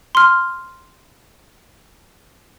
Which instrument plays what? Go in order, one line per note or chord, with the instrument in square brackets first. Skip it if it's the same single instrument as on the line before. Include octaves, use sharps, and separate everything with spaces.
[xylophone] C6 F6